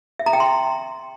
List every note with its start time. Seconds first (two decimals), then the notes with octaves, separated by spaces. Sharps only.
0.19 E5
0.26 A#5
0.33 G5
0.40 C6